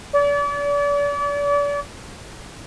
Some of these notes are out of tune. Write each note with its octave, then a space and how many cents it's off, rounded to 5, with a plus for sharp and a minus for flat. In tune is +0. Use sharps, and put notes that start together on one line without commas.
D5 -40